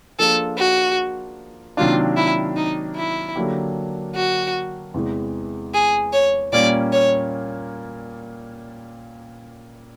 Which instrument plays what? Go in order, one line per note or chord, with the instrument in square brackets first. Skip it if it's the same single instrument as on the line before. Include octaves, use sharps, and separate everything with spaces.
[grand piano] F3 A#3 D4 F4 G#4 [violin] A4
[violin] F#4
[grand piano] C3 D#3 F#3 A#3 D4 [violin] F4
[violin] E4
D#4
E4
[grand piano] D3 F#3 A#3 D4 G4
[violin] F#4
[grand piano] E2 C3 E3 G#3
[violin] G#4
C#5
[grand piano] A#2 G3 A#3 C#4 [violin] D5
[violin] C#5